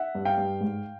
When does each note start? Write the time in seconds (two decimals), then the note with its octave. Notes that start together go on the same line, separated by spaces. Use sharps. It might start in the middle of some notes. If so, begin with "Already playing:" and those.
Already playing: E5 F#5
0.15 G2
0.25 F5 G5
0.38 G2
0.61 G#2